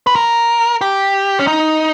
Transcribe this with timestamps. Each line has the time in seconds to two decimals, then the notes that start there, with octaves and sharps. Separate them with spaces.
0.07 B4
0.16 A#4
0.81 G4
1.39 C#4
1.47 D#4